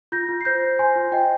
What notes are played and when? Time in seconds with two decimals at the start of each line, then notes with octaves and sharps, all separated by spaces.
0.12 F4 G6 A#6
0.29 F4
0.41 C7
0.45 C5 G6 A#6
0.62 C5
0.79 C5 G#5 C6
0.96 F4
1.12 F4 D#5 G5